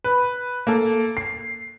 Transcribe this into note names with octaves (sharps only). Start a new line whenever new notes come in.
B4
A#3 A4
C7